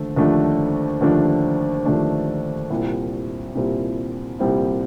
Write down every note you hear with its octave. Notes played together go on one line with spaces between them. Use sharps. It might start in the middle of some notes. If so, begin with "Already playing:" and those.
Already playing: D#2 D3 F3 A3
D#2 D3 F3 A3 D4
D#2 D3 F3 A3 D4
D#2 D3 F3 A3 D4
C2 A#2 G3 C4 E4
C2 A#2 G3 C4 E4
C2 A#2 G3 C4 E4